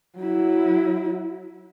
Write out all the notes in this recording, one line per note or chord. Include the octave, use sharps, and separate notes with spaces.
F#3 E4